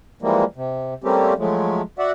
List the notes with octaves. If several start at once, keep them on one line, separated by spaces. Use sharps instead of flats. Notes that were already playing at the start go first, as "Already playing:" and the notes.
E3 F3 G3 G#3 A#3
C3
G3 A3 A#3 C4 C#4 G4
F3 F#3 G#3 A3
F#4 D5 E5 F#5